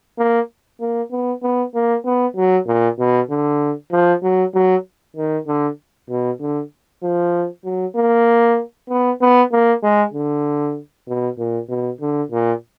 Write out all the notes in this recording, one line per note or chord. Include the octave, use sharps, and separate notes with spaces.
A#3
A#3
B3
B3
A#3
B3
F#3
A#2
B2
D3
F3
F#3
F#3
D#3
D3
B2
D3
F3
F#3
A#3
B3
B3
A#3
G#3
D3
B2
A#2
B2
D3
A#2